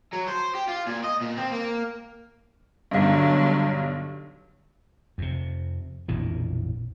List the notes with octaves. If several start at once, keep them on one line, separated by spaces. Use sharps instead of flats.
F#3
C5
G4
F4
A#2
D#5
A#2
C4
A#3
B1 G2 D3 F#3
F2 C3
A#1 F2 B2 E3